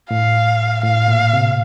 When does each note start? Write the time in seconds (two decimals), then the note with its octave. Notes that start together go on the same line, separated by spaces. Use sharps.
0.10 A2 F5
0.83 A2 F5
1.08 A#2
1.33 C3